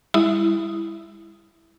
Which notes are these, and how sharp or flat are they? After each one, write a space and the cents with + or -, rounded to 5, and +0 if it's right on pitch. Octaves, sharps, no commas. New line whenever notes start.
G3 +40 E4 +0 D#6 +0